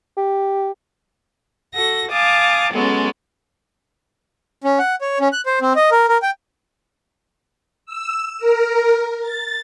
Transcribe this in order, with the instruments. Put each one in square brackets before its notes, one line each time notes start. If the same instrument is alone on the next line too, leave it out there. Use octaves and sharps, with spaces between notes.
[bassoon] G4
[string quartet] F#4 A4 A#6
F5 G#5 A5 D6 D#6
F#3 G#3 B3 C#4 A4
[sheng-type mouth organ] C#4
F#5
C#5
C#4
F#6
C5
C4
D#5
A#4
A#4
G5
[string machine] E6
A#4
A6